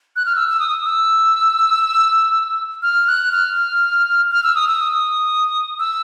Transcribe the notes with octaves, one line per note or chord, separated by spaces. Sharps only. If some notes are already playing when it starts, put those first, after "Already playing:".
F#6
F6
E6
E6
D#6
E6
F6
F#6
F6
F6
E6
D#6
E6
D#6
E6